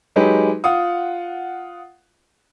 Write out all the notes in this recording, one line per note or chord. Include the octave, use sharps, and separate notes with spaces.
F#3 G#3 D#4 G4 B4
F4 F#5 D#6